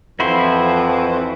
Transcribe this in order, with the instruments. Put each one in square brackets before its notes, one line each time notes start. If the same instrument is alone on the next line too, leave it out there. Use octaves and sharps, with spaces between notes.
[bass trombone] F2 [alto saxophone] E3 [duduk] F3 [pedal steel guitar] E4 F#4 C5